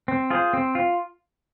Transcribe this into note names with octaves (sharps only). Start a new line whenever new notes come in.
C4
F4 G#4 C5
C4
F4